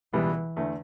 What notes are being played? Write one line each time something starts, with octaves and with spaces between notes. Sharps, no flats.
C#2 B2 E3 G3 B3
E2 D3 A3